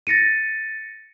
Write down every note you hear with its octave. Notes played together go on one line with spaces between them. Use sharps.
A6 A#6 C#7 D#7